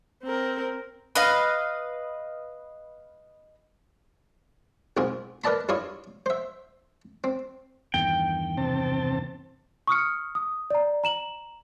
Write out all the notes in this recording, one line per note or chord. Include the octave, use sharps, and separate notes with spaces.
C4 A#4
B4 D#5 F5
B1 G#2 C4 F4 G#4
A#4 B4 D5 D#5 A5 B5
G2 E4 F4 C#5 C#6 D#6
C5 E5
C4
E2 G2 D#3 G5
C3 C4 A5
C#6 D#6 F6 C#7
D#6
D5 A#5
A#5 E7 F#7